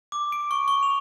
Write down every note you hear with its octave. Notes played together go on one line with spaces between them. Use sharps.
D6
D7
C#6
C#6
F7